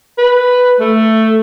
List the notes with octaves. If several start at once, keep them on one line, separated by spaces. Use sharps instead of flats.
B4
A3